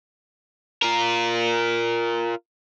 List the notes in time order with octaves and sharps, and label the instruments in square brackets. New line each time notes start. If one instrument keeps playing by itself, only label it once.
[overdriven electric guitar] F4 A#4